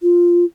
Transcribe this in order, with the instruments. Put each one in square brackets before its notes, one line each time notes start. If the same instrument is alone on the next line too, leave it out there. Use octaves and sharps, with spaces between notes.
[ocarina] F4